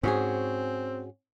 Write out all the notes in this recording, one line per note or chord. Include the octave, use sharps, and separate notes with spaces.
G#2 C4 C#4 F#4 G#4